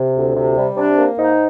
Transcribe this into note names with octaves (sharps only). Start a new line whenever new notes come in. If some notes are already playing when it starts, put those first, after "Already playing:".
Already playing: C3
D2
C3
G3
C3 D4
A#3
G#2 D#4